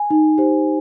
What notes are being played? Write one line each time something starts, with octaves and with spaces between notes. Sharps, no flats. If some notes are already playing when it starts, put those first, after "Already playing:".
Already playing: G#5
D#4
G4 C5